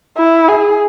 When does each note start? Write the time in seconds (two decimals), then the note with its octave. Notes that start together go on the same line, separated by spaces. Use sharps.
0.17 E4
0.48 G#4